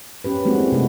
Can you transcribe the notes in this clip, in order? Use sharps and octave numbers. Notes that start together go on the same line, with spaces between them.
C#4 G4 B4
G#3 A#3 C4 D4 F#4
E4
C3 A3 D#4 F#4